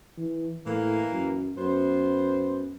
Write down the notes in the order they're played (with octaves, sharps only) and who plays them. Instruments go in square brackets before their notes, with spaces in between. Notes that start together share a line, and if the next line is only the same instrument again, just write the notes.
[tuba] E3
[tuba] A2 [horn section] E3 A#3
[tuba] F#2
[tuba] F#2 [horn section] B3 C5